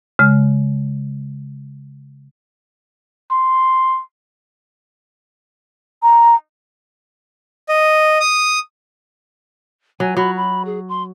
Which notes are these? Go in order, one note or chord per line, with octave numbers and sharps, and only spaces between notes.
C#3 G#3
C6
A#5
D#5
D#6
F#3 G#5
F#3 B5
B5
G#4
C6